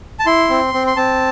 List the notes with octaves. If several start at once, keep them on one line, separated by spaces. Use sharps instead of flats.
A5
E4 C6
C4
C4
C6
C4 A5